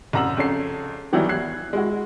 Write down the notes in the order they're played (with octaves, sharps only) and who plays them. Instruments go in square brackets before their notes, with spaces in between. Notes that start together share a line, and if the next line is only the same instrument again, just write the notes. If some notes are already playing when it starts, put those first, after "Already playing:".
[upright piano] C2 F#2 A#5 E6 F#7
F2 C#3 C#5 C7
D#3 E3 F#3 G3 B3 E4
F#6 G#6 C7
G#3 E4 F#4